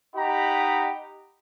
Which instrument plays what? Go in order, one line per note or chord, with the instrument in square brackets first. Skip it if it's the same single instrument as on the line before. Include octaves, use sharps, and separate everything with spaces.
[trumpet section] D#4 G4 D#5 F#5 A#5 B5